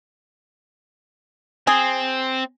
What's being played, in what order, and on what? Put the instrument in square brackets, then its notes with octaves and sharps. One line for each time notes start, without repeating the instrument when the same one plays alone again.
[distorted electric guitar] C4 [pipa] G#4